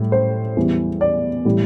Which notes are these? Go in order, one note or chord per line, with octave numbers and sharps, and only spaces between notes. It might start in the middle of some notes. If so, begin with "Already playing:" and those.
Already playing: A2 G3
C5
E2 E3 G3
D5
A2 E3 G3